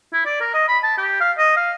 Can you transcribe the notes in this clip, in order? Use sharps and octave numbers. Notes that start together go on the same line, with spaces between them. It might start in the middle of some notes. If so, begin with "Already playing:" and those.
E4
D5
A#4
D#5
B5
A5
G4
F5
D#5
F5